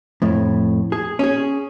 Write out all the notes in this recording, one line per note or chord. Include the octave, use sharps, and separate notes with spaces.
F2 A2
G#4
C#4 G#4